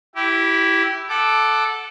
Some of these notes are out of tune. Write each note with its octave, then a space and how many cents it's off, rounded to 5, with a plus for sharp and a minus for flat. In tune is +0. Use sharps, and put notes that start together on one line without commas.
E4 +0 G4 -20
A4 -10 F#5 +0 D6 +10